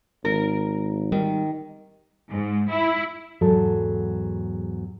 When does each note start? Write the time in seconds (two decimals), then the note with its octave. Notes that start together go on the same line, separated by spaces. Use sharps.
0.25 G#1 A#4
1.12 D#3 G3
2.29 G#2
2.71 E4
3.41 E2 G#2 F#3 A4